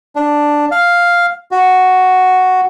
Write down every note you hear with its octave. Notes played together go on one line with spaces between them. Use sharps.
D4
F5
F#4